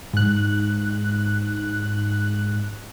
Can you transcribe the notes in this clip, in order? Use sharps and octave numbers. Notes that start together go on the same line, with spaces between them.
G#2 F#6